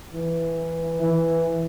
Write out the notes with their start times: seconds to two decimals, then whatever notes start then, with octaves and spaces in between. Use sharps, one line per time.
0.13 E3
1.01 E3